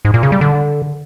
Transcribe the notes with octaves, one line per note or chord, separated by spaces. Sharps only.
G#2
A#2
C#3
G3
D3